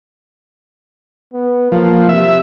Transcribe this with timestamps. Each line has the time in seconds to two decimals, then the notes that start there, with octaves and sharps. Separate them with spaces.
1.33 B3
1.72 F3 A#3
2.09 C3 E5